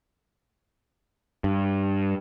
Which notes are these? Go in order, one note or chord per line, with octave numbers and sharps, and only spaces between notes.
G2